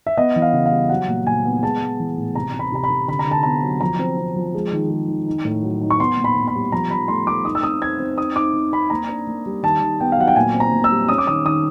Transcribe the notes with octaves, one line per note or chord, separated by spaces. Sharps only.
E5
B3 D#5
E3
F5
C#3
F5
G3
F#3 F#5
A#2
A#2 G#5
B3
G#3 A5
G#3
E3
A2
C3 A#5
C3
B5
C3 A#5
B5
C3
D3 B5
A#5
D3
A5
B3 A#5
F#3
F3 A#5
C4
C4
F3
G#3
D#3
G#3
D#3
D#4
A2
F#3
D#4
C#6
B3 C6
A#2
B5
B3
B5
G3
F3 A#5
F3 B5
A3 C6
A3 D6
D#4 D#6
E6
C4 D#6
C4 G#6
C4
D#4 D#6
D#4 D6
C4
C4 B5
A#3 A#5
D4
A#3
G3
D#3 A5
D#3
B3 G5
F5
F#3 F#5
G5
A#2 G#5
C4
A#5
A#2
E6
G3
C#4 D#6
D6
D#3 D#6
D#3 D#6